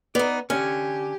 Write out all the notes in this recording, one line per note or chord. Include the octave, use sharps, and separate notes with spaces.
B3 D#4 D5
D3 C#4 G4 G#5